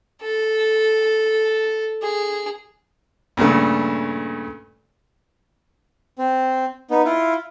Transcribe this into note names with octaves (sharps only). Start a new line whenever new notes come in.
A4
G#4
G2 A#2 C#3 A3
C4
B3 D#4
E4 F4